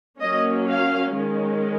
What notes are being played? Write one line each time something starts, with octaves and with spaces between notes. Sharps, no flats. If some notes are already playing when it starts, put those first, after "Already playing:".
F#3 A#3 C#4 D#5
F5
D#3 G#3 C#4